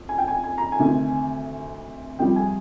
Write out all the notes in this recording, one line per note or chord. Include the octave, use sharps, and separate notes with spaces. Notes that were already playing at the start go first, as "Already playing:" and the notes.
Already playing: F2
G#5
G5
G#5
G#5
A#5
G#5
D2 C3 D#3
F2 C3 G3 G5
G#5